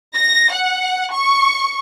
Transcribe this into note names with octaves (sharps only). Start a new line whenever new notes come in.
A#6
F#5
C#6